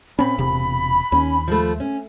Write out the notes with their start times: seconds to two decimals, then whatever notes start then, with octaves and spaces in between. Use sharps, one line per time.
0.19 A#2 C4 C#4 B5
0.38 E1 C3
1.12 D#2 C#4
1.48 F3 G#3 A3
1.80 C#4